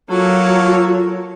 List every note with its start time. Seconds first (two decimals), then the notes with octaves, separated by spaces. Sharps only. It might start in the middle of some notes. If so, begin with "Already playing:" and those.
0.10 F#3 A#3 F4 A4 C#5